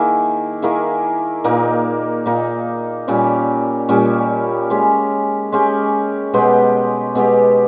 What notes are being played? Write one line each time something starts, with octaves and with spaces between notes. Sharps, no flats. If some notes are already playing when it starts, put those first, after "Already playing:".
Already playing: D#3 A#3 E4 G#4
D#3 A#3 E4 G#4
A#2 A#3 D#4
A#2 A#3 D#4
A#2 G3 C#4
A#2 G3 C#4
G#3 C#4 G4
G#3 C#4 G4
B2 G#3 B3 G4
B2 G#3 B3 G4